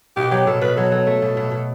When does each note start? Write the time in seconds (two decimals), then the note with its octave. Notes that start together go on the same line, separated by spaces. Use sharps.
0.17 B2 G4
0.31 F#3 G4
0.47 B2 A4
0.61 B2 B4
0.77 F#3 A4
0.91 F#3 A4
1.07 A3
1.22 B2
1.37 B2
1.52 B2